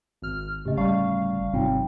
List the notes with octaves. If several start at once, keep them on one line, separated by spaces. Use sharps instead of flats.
G#1 F6
A2 C#3 G4 D#5
G1 G3 F5 A5 C#6
G#1 C3 F#3 C4 D#4 F4 G5